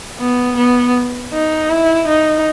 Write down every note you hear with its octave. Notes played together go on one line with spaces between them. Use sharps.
B3
B3
D#4
E4
D#4